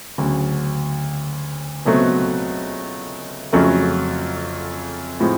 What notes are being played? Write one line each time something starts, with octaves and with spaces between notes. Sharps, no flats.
D2 C#3 F#3
C#2 B2 F#3 A3 C4
F2 C#3 F#3 A3
A2 F3 G#3 C4